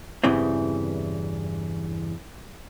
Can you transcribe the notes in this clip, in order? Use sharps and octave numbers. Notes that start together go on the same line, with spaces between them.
E2 G2 C#3 E3 G3 C4